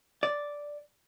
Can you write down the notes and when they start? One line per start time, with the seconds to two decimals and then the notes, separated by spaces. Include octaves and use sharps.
0.23 D5